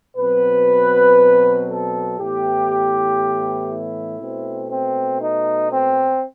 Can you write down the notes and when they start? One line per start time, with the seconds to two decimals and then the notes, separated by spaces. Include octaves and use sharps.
0.17 B2 F#3 C4 B4
1.68 A4
2.18 A2 E3 B3 G4
3.69 E4
4.20 B2 A3 C4
4.70 C4
5.21 D#4
5.70 C4